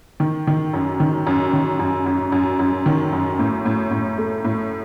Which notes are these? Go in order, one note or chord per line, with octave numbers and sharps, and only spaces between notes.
D#3
D#3
F#2
D#3
F#2
D#3
F#2
F#2
F#2
F#2
D#3
F#2
A2
A2
A2
A3
A2